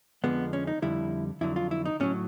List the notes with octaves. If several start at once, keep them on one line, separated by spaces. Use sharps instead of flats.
F2 D3 F3 G#3 B3
C#4
D#4
F2 D3 G3 E4
F2 D3 F#3 E4
F4
E4
D#4
A2 F#3 C#4